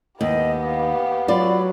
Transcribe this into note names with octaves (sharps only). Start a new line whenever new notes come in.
D#2 B3 G4 D#5
F5
F#3 F4 D5 B5